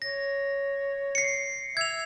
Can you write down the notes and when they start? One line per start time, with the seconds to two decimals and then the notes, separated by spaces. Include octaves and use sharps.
0.02 C#5 A#6
1.15 C7 C#7
1.77 E5 G#6 F7